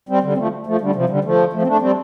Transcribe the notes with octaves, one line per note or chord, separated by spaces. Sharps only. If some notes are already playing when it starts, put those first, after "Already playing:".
G3 C4
D3 G3
C4
F3 A3
F3 A3
D3 G3
C3 F3
D3 G3
F3 A3
F3 A3
C4
A3 D4
G3 C4